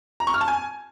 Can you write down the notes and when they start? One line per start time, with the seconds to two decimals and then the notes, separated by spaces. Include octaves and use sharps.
0.20 A#5
0.27 C#6
0.34 F6
0.41 A5
0.48 G#5